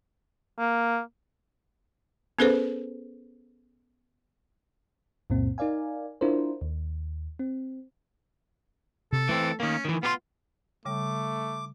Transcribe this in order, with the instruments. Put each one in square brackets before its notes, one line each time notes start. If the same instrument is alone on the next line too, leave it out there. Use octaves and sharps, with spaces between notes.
[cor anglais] A#3
[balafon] B3 C#4 G#4 A4 B4 C5
[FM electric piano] C#2 F#2 A#2 C4
D#4 A#4 D5 F5 G#5
D4 E4 F4 A#4 C5
D#2
C4
[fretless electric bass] C3 [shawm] A4
[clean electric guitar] E3 C4 [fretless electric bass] A3
[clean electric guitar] D#3 A#3 [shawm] C#4
[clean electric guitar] D#3 E3
[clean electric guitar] B3 G4 C6 [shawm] F4
[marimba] C#3 G3 [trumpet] A3 [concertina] D6